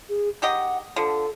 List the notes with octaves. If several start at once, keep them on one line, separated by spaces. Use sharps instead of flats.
G#4
D#3 G4 D#5 F#5
D3 F3 A4